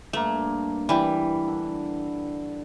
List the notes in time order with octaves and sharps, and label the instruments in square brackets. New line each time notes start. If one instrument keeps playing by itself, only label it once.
[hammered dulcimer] G2 A#3 [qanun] A3
[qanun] E3 G3 [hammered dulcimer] B5
[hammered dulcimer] D3